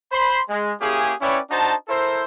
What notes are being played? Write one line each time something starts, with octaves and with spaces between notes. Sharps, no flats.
C5 B5 C6
G#3
A#3 C#4 E4 G4 G#4
C#4 E4 B4 C#5 D5 G5
D4 D#4 F#4 C5 A5
E4 A4 A#4 C5